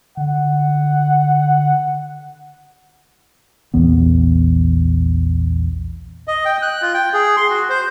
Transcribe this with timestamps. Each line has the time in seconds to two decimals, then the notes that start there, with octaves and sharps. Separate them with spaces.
0.17 D3 F#5
3.74 A#1 E2 E3 B3
6.28 D#5
6.45 G5
6.62 F#6
6.82 F4
6.94 G5
7.13 G#4
7.37 C6
7.50 F#4
7.69 C5